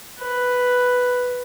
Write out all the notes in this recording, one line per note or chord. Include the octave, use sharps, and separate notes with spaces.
B4